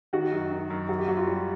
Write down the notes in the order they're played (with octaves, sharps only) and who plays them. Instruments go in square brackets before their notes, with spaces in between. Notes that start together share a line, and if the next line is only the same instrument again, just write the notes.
[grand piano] D#3 [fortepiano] F#4
[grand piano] F#2
D#3
F#2
[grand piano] F#2 [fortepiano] F#4
[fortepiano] G4
[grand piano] F#2 [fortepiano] F#4
[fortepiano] F4
[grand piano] G3